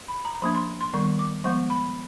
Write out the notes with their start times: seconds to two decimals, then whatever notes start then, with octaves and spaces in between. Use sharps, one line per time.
0.08 B5
0.25 A#5
0.35 A#5
0.42 F3 A#3 D4 B5
0.55 C6
0.81 C6
0.94 D#3 G3 B3 C#6
1.19 D6
1.44 F3 G#3 B3 C#6
1.70 B5